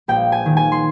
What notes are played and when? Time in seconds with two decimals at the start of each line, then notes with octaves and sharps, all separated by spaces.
0.08 A#1 G5
0.32 G#5
0.46 D#3
0.57 G#5
0.72 C6